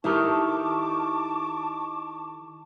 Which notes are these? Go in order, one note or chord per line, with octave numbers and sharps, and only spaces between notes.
D#3 E4 G4 A4 A#4 A5 C#6 D6